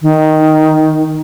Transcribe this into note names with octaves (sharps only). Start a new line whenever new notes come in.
D#3